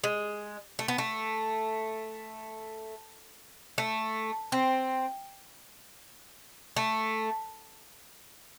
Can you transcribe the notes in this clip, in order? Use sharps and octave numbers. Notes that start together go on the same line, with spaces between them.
G#3
A3
B3
A3
A3
C4
A3